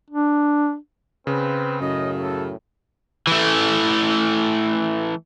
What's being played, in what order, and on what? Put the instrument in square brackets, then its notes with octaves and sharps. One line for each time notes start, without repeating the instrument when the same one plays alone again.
[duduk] D4
[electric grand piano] C#3 [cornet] C4 [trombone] B4
[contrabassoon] F#2 [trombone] A2 [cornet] D#5
[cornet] A4
[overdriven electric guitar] E3 A3